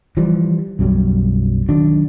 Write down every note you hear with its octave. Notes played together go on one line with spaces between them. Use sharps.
E3 F3 G3
B1 F#2 F#3 G3
D#3 F#3 D4